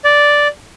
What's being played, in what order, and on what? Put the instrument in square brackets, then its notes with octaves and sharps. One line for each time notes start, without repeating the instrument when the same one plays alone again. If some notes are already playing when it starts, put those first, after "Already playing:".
[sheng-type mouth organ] D5